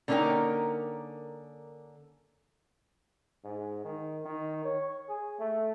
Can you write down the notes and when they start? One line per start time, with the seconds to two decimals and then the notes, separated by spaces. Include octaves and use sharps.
0.08 D3 A#3 C#4 D#4 A#4 G5
3.45 G#2
3.85 D#3
4.25 D#3
4.64 C#5
5.09 G#4
5.40 A3